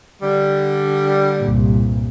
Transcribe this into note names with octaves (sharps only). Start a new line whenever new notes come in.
D3 G3
C2 G2 A#2